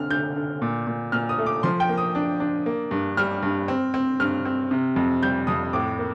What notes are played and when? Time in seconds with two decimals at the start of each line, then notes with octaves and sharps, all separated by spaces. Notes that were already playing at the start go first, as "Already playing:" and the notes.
Already playing: D3 C4 F6
0.10 D3 G6
0.36 D3
0.62 A#2
0.87 A#2
1.12 A#2 F6
1.29 D#6
1.38 A3
1.46 D6
1.63 F3 C6
1.80 G5
1.89 A#3
1.98 D#6
2.15 D4
2.40 D4
2.66 A#3
2.91 G2
3.17 G3 F6
3.43 G2
3.68 C4
3.94 C4
4.20 G2 F6
4.45 C4
4.71 C3
4.96 F2
5.23 G3 G6
5.47 F2 D#6
5.73 A2 D6
5.99 A#3